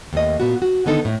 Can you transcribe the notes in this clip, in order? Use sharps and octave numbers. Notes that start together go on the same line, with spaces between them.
D#2 A3 D#5
A#2 B3 F#4
F#4
D3 D#3 B3 D#4 A4
A2